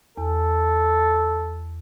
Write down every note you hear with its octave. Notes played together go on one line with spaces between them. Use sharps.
E2 A4